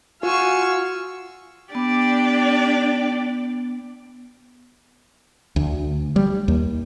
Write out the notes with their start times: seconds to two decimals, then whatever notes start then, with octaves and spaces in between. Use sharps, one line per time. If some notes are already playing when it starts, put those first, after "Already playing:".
0.23 F4 F#4 F5 G#5 C#6 E6
1.75 B3 D4 G4 D5
5.56 D2
6.16 G3
6.48 D#2